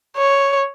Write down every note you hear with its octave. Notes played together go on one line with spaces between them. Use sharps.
C#5